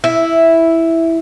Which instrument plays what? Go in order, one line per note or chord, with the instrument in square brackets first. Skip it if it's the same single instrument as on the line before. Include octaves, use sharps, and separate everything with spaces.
[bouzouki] E4